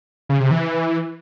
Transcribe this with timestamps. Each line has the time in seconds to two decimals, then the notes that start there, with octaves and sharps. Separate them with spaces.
0.29 C#3
0.40 C3
0.51 E3